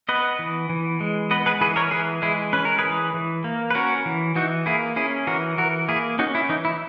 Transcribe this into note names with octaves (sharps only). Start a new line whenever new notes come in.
B3 B4 D#5
E3
E3
G#3
B3 B4 D#5
G#4 B4
E3 G#4 B4
A#4 C#5
E3 G#4 B4
G#3 E4 G#4
C#4 B4
A#4
E3 G#4 B4
E3
A#3
B4
C#4 F#4 A#4
E3
E3 D#4 F#4
A#3 E4 G#4
C#4 E4 G#4
E3 F#4 A#4
E3 F#4 A#4
A#3 E4 G#4
C#4 D#4 F#4
E4
E3 D#4
E4